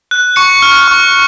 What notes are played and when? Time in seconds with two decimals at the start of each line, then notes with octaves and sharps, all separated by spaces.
0.11 F#6
0.36 C#6 C#7
0.62 F6
0.88 C#6